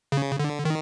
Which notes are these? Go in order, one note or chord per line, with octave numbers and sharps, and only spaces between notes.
C#3
D3
D#3